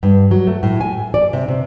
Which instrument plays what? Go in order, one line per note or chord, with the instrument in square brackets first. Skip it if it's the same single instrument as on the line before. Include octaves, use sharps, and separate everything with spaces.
[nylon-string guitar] G2
F#3
A3
A2
G#5
D5
C3
C3